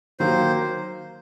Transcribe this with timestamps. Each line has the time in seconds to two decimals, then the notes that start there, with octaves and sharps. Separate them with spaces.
0.20 D#3 F#3 A#3 C5